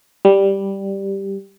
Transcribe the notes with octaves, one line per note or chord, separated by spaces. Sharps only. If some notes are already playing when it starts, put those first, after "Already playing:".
G3